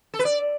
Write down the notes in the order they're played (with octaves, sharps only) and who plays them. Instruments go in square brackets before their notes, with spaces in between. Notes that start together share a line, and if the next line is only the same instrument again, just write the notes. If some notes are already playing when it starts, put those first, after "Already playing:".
[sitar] A4
B4
D5